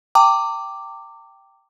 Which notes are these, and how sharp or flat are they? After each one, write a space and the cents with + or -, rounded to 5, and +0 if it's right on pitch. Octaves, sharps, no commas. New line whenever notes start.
G5 +0 A#5 -40 D6 +0